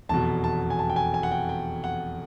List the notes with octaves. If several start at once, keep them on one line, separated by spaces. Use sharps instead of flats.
F1 E2 B2 A5
A5
G#5
A5
G5
G#5
G#5
F#5
G5
G5
F#5